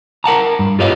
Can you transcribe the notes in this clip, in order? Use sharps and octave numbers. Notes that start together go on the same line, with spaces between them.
A#4 F#5 A5 A#5
G2
F4 G4 B4 C#5 D#5 F5